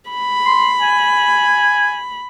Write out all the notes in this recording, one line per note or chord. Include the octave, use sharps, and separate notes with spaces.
B5
C6
G#5